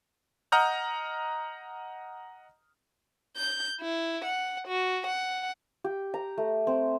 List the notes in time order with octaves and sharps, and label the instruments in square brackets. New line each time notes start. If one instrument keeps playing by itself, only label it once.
[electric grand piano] D#5 F#5 A#5 D#6 F6 G6
[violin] G6
E4
F#5
F#4
F#5
[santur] G4
A#5
A3
C4